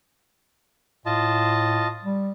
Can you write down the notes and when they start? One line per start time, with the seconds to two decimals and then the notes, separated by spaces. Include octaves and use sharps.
1.06 A2 F4 D#5 A5
2.03 G3